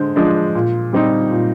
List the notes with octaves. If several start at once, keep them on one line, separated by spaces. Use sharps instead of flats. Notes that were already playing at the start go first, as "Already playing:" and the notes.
Already playing: D3 G#3 C5
F3 G#3 D4
A#2
G3 C4 D#4
A#2